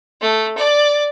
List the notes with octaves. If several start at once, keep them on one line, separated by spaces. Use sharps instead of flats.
A3
D5